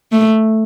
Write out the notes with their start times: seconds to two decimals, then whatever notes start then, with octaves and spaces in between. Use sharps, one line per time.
0.12 A3